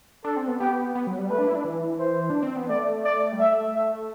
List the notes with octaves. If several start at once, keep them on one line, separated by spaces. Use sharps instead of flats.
D4 A4
C4
B3
B3 G4
B3
F#3
G3
A3 B4
D4
E4
D4
E3
C5
D4
C4
B3
A3 D5
D5
G3
A3 E5
E5